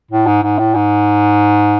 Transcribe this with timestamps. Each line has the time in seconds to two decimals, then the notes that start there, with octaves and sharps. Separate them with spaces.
0.11 A2
0.26 G#2
0.43 G#2
0.58 A2
0.75 G#2